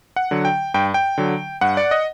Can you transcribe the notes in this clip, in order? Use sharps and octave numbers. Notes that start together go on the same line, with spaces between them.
F#5
D3 F#3
G5
G2 G5
G5
D3 F#3
G2 F#5
D5
D#5